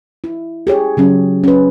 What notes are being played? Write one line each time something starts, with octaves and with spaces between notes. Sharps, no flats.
E4
G4 G#4 C#5
C#3 F#3 C#4
C#4 B4